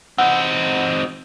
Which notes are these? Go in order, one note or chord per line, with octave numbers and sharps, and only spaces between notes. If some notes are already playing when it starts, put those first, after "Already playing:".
C4 D#4 F#5